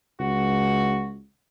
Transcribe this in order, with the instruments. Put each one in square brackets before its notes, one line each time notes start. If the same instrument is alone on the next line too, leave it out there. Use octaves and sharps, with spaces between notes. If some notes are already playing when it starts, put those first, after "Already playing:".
[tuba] C#2 [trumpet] F#4